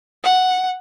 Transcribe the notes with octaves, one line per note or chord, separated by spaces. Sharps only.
F#5